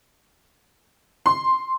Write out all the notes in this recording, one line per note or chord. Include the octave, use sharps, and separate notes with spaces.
C6